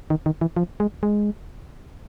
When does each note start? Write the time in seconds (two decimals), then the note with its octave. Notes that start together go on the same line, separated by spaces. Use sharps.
0.10 D#3
0.26 D#3
0.41 E3
0.57 F3
0.80 G#3
1.03 G#3